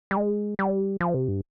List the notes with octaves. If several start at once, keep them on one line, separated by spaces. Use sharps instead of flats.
G3
G#3
G3
F3
C3
G2